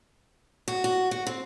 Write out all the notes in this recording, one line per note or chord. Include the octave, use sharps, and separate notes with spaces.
F#4
F#4
F#4
C4